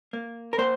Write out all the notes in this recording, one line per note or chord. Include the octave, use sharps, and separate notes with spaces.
A#3
A#4
A#3 C5